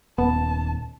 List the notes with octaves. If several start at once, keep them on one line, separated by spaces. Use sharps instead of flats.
D#1 B3 A5